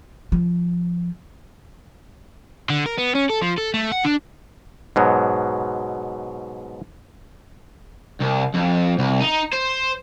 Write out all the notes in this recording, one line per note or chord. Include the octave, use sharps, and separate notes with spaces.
F3
D3
A#4
B3
C#4
A4
F3
A4
A3
F#5
D4
G#2 B2 F#3
C2
F2
C2
D#4
C5